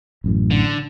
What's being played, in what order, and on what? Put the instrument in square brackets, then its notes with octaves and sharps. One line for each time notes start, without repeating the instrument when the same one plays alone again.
[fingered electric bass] A1 F#2 A2
[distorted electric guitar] D3